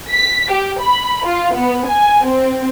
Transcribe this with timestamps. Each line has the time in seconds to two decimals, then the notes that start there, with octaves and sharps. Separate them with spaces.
0.11 B6
0.52 G4
0.82 B5
1.26 F4
1.55 B3
1.87 G#5
2.26 C4